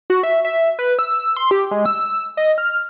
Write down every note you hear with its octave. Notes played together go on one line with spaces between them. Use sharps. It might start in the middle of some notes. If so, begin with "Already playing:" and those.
F#4
E5
E5
B4
E6
C6
G4
G#3
E6
D#5
F6